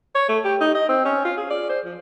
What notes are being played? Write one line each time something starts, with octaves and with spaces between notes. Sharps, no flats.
C#5
A3
G4
D#4
D#5
C4
C#4
F4
G#4
D5
C5
F3